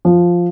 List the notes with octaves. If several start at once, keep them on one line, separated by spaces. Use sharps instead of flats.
F3